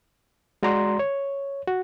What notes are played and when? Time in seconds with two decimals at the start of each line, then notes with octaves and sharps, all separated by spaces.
0.63 G#3 F#4 D5 A#5 C6
0.99 C#5
1.67 F#4